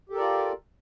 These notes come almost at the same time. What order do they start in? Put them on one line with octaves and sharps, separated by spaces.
G4 A4 A#4 D5 F4